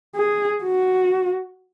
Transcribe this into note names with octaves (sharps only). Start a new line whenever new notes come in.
G#4
F#4